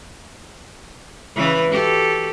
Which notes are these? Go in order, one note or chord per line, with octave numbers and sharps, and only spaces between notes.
C#3 E3 B4
F#4 G4 A4